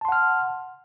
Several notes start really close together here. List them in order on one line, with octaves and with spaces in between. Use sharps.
A5 C6 F#5 F6